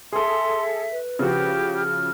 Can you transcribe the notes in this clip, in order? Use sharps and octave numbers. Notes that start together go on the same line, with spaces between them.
G#4 A4 E5 C6
B4
C#3 F3 F#4 G4
F6